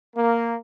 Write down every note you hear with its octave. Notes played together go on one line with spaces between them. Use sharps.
A#3